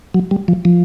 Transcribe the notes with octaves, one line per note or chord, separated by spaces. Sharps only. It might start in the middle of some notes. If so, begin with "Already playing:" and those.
F#3
G3
F3
F3